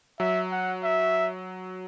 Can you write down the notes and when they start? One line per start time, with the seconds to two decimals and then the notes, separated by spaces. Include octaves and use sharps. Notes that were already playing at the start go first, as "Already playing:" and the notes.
0.19 F#3 E5
0.52 F#5
0.84 E5